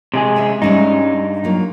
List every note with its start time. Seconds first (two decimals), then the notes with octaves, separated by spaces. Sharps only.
0.14 C3 G#3 G#4
0.36 C#4 E5
0.62 G2 G3 G#3 C#4 D#4
1.44 F#3 A#3 F4